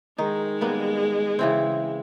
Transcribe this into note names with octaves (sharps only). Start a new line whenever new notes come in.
D#3 G#3 D#4
G3 A#3 B3
C#3 E3 C4